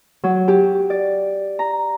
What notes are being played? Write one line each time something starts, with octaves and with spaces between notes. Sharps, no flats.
F#3
G4
D5
A#5